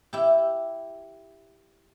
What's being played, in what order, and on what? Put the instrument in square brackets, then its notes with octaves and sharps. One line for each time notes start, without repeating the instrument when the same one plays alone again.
[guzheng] E4 G4